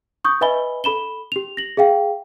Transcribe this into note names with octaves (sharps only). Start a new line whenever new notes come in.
C#6 D#6 G6
B4 D#5 E5 G#5 B5 G7
A4 B5 E7 G7
G4 F7
A#6 F#7
G#4 E5 F5 G5